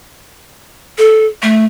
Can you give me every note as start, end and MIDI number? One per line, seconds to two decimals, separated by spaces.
0.98 1.25 69
1.42 1.65 57